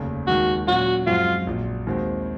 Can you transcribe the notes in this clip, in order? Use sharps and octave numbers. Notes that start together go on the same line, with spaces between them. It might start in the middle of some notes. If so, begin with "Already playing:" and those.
Already playing: F1 D#2 C#3
D#2 D#3 G#3 F#4
A#2 F#3 C#4 F#4
F#2 F3 G#3 C4 F4 F#4
A#1 A#2 F#3
D#2 D#3 G#3 C4 F#4